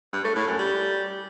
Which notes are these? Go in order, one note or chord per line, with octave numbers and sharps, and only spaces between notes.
G2
A3
A2
F#2
G3